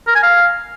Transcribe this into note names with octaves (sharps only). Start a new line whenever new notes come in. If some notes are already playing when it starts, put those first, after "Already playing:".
A#4
G#5
F5